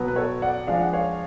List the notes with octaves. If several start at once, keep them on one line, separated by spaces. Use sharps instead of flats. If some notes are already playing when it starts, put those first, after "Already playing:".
Already playing: B2 F#3 B3
B4
A4 C#5
D5 F#5
F3 G#3 D4 F5
F#5
C#5 F5